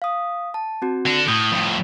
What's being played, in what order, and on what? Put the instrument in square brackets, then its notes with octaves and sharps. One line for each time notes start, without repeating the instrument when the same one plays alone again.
[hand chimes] F5 D#6
A5
C4 F#4
[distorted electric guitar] D3 D4 [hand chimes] A#6 C#7
[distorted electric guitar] A2 [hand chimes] D#6 G6
[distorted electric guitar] F2 A2